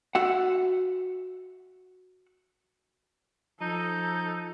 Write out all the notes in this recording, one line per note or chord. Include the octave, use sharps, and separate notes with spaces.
F#4 E5 F#5
F3 D#4 A4 G6